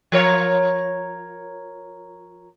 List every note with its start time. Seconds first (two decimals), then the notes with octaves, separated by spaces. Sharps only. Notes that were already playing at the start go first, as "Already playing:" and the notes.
0.12 F3 A#4 C#5